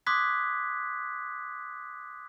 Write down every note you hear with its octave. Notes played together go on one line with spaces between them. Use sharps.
C6 D6 D#6 F#6 G#6 B6